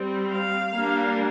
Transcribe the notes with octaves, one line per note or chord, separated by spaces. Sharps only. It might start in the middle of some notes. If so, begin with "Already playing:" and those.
Already playing: G3 C4
F5
G3 A#3 D4